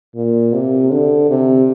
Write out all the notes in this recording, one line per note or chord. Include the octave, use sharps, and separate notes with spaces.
A#2
C3
D3
C3